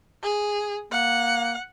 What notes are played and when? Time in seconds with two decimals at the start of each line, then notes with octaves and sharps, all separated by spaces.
0.23 G#4
0.92 A#3 F#5